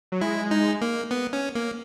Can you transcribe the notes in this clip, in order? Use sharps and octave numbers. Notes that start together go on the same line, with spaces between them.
F#3
G#3 E4
D#4
A#3
B3
C#4
A#3